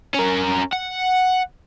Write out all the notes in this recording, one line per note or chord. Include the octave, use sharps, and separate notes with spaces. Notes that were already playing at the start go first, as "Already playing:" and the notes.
C#4 A#4
F#5